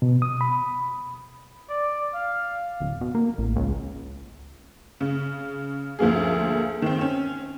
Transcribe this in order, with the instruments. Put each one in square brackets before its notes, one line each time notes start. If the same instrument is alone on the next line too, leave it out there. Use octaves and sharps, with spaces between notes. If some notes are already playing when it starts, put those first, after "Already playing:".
[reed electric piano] B2
D#6
B5
[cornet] D5
F5
[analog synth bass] D1
B2
A#3
A1
C#2
[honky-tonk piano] C#3
D2 F3 A#3 G#4
D#3 C4
C#4